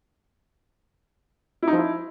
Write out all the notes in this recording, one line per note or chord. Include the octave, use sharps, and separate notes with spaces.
E4
D#4
F3
E4